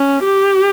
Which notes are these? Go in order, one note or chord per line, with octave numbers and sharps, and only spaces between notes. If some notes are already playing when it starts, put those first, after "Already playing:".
Already playing: C#4
G4